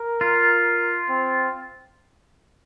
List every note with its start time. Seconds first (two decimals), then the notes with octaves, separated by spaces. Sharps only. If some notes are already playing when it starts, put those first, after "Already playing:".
Already playing: A#4
0.21 F4
1.09 C4